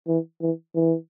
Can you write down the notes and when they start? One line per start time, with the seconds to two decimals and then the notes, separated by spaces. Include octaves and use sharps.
0.08 E3
0.42 E3
0.75 E3